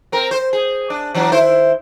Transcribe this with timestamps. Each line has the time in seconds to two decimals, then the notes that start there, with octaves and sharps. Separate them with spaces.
0.12 C4 A#4
0.31 C5
0.53 G#4
0.90 D4
1.14 E3 F#3 D4
1.32 D#3 E4 C5